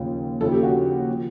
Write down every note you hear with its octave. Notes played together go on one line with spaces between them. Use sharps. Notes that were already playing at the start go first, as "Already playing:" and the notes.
Already playing: D#2 C#3 F3
D#2 C#3 F3 A4
G4
F#4
F3